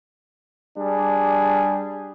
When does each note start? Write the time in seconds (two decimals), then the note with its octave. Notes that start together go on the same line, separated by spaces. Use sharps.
0.79 G3 D4 G#4